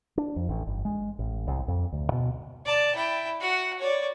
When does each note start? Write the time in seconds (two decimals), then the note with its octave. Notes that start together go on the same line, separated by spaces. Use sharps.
0.18 D4
0.36 F2
0.49 A1
0.67 G1
0.85 G#3
1.19 A1
1.47 C2
1.68 F2
1.92 D2
2.12 B2
2.66 D5 A5
2.95 E4 G5
3.40 F#4 F#5
3.79 C#5 D5